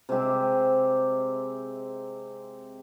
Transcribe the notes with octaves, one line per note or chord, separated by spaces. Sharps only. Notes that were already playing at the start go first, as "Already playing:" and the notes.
C3 G#3 G4 E5